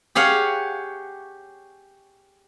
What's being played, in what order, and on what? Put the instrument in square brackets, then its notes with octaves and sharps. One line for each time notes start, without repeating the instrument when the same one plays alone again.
[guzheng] G4 G#4 C#5 F5 F#5